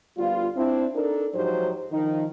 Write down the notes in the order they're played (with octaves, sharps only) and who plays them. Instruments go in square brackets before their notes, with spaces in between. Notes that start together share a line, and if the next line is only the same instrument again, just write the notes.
[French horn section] D2 G3 B3 F4
C4 D4 E4
D4 D#4 A4 A#4
G#2 F3 F#3 D#4 G4 C5
D#3 F3 D#4